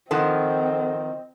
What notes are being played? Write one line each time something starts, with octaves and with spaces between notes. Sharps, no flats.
D#3 F3 C4 A4 D#5 F#5